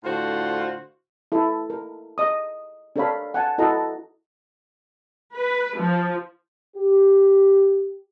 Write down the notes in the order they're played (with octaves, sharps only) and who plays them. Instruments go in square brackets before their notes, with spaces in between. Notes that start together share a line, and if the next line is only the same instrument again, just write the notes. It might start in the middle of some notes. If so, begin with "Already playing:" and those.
[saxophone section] A2 D3 F4 F#4 C5
[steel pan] E4 A4 E5
A#4
D#5 D#6
D4 A4 A#4 C#5 F5 B5
F#5 G#5 A5
E4 F#4 A4 D#5 F#5 A#5
[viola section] B4
F3
[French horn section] G4